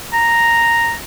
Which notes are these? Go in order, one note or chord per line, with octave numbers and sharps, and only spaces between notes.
A#5